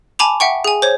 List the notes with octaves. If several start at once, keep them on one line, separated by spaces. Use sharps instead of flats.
G#5 A5 B5 D6 F7
E5 F#5 G5 C#6
G#4 G#5
C5 C#5